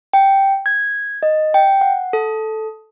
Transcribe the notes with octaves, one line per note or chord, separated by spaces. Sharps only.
G5
G#6
D#5
G5
F#5
A4